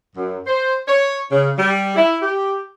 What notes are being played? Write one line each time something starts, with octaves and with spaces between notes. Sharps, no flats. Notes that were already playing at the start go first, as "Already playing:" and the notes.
F#2
C5
C#5
C#3
G3
E4
G4